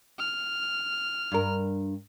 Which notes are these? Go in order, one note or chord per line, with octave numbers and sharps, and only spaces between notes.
F6
G2 A#4